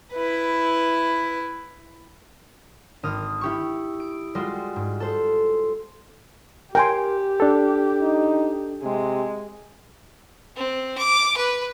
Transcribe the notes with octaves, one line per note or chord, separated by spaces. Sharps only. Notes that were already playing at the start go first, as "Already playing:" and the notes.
E4 B4
G#1 D#6 F6
E4 G4 C#6
D7
G3 G#3 F4 F#4
G#2
A4 C5
G4 A#4 G5 G#5 C6
D4 A4
D#4
C3 G#3
C4
D6
B4